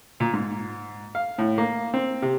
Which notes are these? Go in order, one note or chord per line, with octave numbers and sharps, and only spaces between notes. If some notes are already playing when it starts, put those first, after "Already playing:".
A#2
G#2
F5
A2
A#3
C4
C3